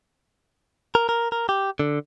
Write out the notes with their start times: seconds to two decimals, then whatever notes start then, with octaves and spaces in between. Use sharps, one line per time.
0.95 A#4
1.09 A#4
1.32 A#4
1.49 G4
1.79 D3